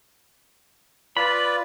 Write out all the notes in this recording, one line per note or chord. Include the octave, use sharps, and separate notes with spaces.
F4 B4 D5 B5